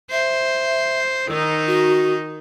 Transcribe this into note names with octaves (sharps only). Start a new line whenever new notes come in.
C5 E5
D#3 D#4 E6
F#4